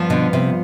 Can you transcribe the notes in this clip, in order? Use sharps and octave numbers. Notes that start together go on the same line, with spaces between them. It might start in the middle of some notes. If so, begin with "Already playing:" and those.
Already playing: G2 F3 B3 F4
B2 D3
C3